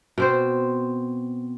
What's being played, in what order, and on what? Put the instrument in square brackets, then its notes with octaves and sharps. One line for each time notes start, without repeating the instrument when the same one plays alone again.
[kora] B2 C4 C5